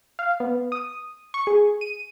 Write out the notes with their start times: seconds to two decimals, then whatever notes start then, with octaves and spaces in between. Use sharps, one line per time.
0.19 F5
0.40 B3
0.72 D#6
1.34 C#6
1.47 G#4
1.81 D#7